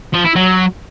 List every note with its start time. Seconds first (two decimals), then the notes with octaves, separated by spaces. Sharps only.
0.14 F3
0.25 E4
0.36 F#3